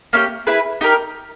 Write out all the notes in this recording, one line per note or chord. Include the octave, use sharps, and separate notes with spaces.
A#3 C#4 E4 G4
E4 G#4 B4
D#4 G4 A#4